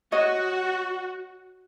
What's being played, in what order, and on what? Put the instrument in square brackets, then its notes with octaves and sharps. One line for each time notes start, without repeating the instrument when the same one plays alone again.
[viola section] F#4 [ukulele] C#5 D#5